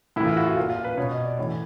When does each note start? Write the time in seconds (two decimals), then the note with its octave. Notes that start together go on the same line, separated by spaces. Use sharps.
0.16 A2 E3 E4
0.27 F4
0.37 F#4
0.46 F4
0.57 A#2 F4
0.70 F4
0.84 B4
0.97 B2 C#5
1.11 D#5
1.25 D5
1.38 A2 E3 C#5